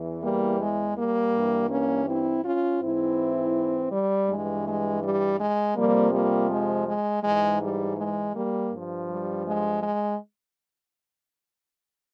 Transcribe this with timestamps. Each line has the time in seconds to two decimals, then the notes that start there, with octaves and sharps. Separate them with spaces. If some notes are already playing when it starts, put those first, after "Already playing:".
Already playing: E2 E3
0.22 G3 A#3
0.59 G#3
0.96 G3 A#3
1.33 G2 E3
1.69 A#3 C#4
2.07 C4 E4
2.43 C#4 F4
2.80 G#2 E3 C4 E4
3.92 G3
4.28 G2 E3 G#3
4.66 G#3
5.02 G3
5.39 G#3
5.76 F2 C3 F3 G3 A#3
6.12 G3 A#3
6.50 G#3
6.86 G#3
7.23 G#2 E3 G#3
7.60 G3
7.97 G#3
8.34 G3 A#3
8.71 G2 F3
9.08 G3
9.46 G#3
9.82 G#3